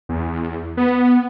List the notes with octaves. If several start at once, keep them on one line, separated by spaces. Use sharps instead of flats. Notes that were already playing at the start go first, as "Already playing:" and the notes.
E2
B3